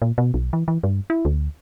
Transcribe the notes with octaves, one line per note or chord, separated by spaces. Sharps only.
A#2
B2
B1
E3
E3
G2
E4
D2